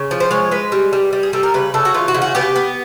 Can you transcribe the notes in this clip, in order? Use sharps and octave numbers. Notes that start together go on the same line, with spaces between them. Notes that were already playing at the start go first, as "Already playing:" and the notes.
Already playing: C#3
F3
C5
G#3 C#5
G#3 B4
G3
G3
G3
G#4
G3 A4
A#4
C#3 B4
C#3 A4
F#4
E3 F4
F#4
C#3
F#4
B3 G4
B3